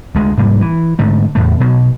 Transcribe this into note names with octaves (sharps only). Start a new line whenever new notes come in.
D2 G#3
F1 G#2 G3 A#3
E3
G#2 D3 A3
E2 A2 A3
B2 F#3